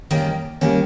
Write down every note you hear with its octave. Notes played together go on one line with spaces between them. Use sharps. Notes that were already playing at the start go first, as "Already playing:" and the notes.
D#3 G3 A#3 C#4
D#3 G3 A#3 C#4